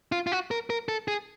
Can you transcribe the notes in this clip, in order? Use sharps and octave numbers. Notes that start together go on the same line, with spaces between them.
F4
F4
F#4
A#4
A#4
A4
G#4